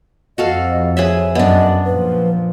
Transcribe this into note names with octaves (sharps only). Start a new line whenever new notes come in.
F2 F#4 A4 D#5 F5
G#4 B4 C#5 E5
F#2 B3 D4 D#5
A#2 F3 B4